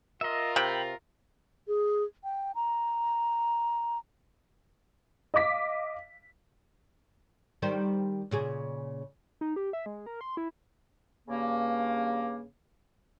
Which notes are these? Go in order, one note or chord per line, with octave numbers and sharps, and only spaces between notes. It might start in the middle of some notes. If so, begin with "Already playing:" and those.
F4 A#4 D#5 E5
C3 G5 B5
G#4
G5
A#5
D#5 F5 D6 B6
D#3 G3 C5
A#2 C#3 G#4
D#4
G4
E5
G#3
A#4
C6
E4
G2 C#3 A#3